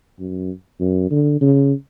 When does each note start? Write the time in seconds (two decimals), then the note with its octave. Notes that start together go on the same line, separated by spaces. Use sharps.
0.19 F#2
0.80 F#2
1.11 D3
1.41 C#3